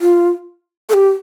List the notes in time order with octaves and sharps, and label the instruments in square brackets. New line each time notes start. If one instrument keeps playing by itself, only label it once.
[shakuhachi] F4
A4
G4